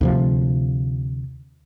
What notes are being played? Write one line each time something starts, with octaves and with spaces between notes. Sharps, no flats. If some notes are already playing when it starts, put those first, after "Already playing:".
D2 C3 F3